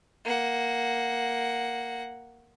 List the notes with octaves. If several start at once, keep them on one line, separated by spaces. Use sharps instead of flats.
A#3 F#5